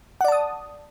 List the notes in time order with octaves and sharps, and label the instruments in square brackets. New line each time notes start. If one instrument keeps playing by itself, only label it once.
[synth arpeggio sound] F#5
D5
A5
D#6